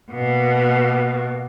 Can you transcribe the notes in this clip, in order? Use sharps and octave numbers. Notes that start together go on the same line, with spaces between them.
B2 A#3